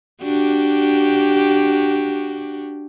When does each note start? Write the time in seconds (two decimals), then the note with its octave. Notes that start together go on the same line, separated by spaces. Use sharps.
0.23 D4 F#4 G4